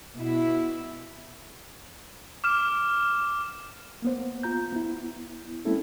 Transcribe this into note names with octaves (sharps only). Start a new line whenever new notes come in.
B2 E4
D6 F6 E7
A#3 B3 C5
F4 A#5 G6
B3 E4
G#3 A#3 C4 C#4 E4 A4